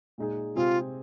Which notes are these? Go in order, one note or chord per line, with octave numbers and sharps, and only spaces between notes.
A#2 G#3 D#4 G#4
C3 G#3 C4 F4 G#4